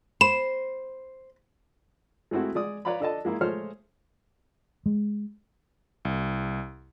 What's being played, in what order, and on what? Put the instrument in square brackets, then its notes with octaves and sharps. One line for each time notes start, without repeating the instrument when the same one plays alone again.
[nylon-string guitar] C5 [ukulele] B5 [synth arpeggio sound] E7
[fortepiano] G#3 A3 C4 E4 F#4
G#3 D5 D#6
B4 C#5 D5 F5 A#5 B5
D4 A4 D#5 A5
G#3 A#3 E4 F4
A#2 G#3 A3 C5 C#5 F6
[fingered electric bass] G#3
[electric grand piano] C2